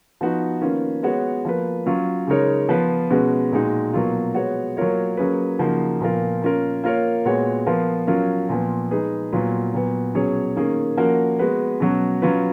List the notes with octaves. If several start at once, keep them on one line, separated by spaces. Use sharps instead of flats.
F3 B3 D#4 F#4
D#3 A#3 C#4 F4 B4
G#3 B3 F#4 C#5
F3 A#3 F4 B4
F#3 C#4 F4
C#3 G#3 D#4 A#4 C#5
F3 B3 F4 B4
B2 G#3 C#4 F#4 B4
A#2 G#3 D#4 F#4
B2 F#3 A#3 F4
G#3 B3 F#4 C#5
F#3 A#3 F4 A#4 C#5
F#3 A#3 C#4 G#4 B4
C#3 F3 A#3 D#4 F#4
A#2 F3 B3 F4 A#4
A#3 C#4 F4 A#4
A#3 F4 A#4 C#5
A#2 G#3 B3 F#4 C#5
F3 B3 F4 A#4
F#3 C#4 F4 A#4
A#2 F3 B3
G#3 D#4 G#4 B4
A#2 F#3 B3 F4
A#2 F#3 B3
B2 F#3 C#4 G#4 C#5
D#3 A#3 C#4 G#4
F3 A#3 C#4 F#4 A#4
G#3 B3 F#4 B4
B2 F#3 C#4 F#4
F#3 C#4 F4 B4